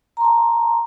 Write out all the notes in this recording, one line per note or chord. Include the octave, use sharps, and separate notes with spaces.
A5 A#5 C6